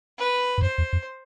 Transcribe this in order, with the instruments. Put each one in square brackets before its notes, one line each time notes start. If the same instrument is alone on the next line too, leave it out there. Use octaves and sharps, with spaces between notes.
[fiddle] B4
[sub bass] G2
[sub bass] F#2 [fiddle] C5
[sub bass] E2
F2